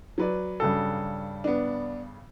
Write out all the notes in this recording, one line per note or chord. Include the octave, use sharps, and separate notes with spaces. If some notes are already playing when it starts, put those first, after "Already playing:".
F#3 B4 D5
G2 C#3 A4
B3 D4